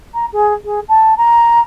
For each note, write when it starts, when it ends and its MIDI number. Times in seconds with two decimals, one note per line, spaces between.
0.14 0.26 82
0.33 0.54 68
0.65 0.80 68
0.89 1.14 81
1.18 1.61 82